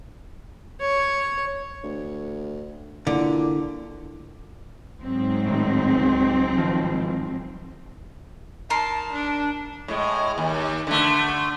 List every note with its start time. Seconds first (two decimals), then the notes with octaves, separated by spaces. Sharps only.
0.80 C#5
1.83 D2
3.07 A#2 D3 E4
5.01 G#2 F#3 C4
5.46 A2 D#3
5.96 C#2
6.58 D#3 F3
8.70 D#4 A#4 A5 C6
9.12 D4
9.88 A2 G#3
10.38 D#2
10.87 D3 A3